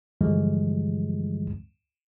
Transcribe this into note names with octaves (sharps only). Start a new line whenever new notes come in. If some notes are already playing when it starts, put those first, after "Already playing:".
G2 D3 E3 F3 G3 G#3